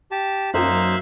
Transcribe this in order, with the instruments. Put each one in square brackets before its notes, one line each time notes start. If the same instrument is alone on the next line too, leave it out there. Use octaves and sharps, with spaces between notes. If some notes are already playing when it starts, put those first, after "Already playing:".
[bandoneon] G4 A5
[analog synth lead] F#2 [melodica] A#3 D#4 C5 [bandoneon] E5 F5 F#6